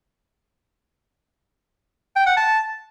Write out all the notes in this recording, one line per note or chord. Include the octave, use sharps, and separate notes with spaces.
G5
F#5
A5